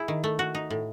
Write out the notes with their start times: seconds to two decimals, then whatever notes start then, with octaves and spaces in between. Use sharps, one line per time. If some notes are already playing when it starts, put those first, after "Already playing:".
Already playing: E4 G#4
0.08 D#3
0.24 A3
0.39 F#4
0.55 D#4
0.70 A2